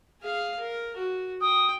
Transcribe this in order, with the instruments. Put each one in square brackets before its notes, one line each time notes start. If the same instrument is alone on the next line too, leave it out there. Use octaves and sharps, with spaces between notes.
[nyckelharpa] G#4 F5
A#4
F#4
[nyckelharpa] G5 [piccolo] D#6